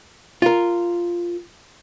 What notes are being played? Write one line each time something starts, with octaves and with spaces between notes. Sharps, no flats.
F4 A#4